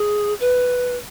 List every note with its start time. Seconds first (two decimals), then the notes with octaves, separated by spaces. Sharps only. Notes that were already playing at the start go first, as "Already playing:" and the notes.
Already playing: G#4
0.40 B4